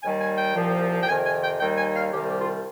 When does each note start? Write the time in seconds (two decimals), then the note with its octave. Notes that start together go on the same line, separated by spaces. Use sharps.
0.02 D#2 D#3 G3 G#5
0.19 G#5
0.37 G5
0.54 C2 A#2 F3
1.02 G5
1.07 F2 C3 D#3 G#5
1.24 G#5
1.42 G5
1.59 D#2 D#3 G3 G5
1.76 G#5
1.95 F5
2.11 C2 C3 D#3 G3 G4
2.28 G4
2.38 F4